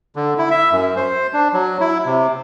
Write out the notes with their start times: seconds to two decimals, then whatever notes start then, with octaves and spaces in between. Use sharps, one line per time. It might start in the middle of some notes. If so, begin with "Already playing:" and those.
0.16 D3
0.38 E4
0.51 E5
0.72 F#2
0.96 C5
1.34 D4
1.54 F#3
1.80 E4
2.06 C3